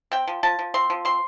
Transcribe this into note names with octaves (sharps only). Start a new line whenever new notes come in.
C4 G5
F3
F3 A5
F3
C4 C6
F3
C4 C6